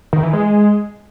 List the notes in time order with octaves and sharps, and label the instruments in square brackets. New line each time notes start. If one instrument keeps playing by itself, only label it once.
[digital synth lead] D#3
E3
G#3